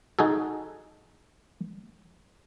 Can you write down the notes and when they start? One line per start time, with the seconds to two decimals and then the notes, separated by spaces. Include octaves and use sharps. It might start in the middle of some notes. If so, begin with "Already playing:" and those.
0.19 D#4 F#4 G#4 A4